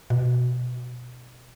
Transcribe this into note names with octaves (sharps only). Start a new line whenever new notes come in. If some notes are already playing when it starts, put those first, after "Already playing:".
B2